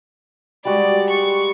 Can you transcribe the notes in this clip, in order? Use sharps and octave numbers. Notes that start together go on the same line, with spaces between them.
G3 G#3 F#4 D5
C#6